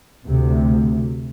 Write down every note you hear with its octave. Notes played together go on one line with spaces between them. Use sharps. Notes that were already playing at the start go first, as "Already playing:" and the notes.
D2 C3